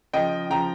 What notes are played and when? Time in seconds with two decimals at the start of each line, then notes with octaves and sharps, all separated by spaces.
0.13 C#3 F3 D#5 G5
0.50 C#3 F3 G5 A#5